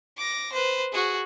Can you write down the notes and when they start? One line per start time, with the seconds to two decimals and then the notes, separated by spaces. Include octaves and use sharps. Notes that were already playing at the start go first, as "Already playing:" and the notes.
0.18 D6 A#6
0.53 B4 C5
0.92 F#4 G#4